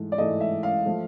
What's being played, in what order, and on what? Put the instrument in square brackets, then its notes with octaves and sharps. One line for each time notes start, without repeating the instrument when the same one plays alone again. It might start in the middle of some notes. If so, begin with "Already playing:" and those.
Already playing: [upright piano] G#2 E3 A3
D5
G#2 E3 A3 D#5
E5
F5
F3 A3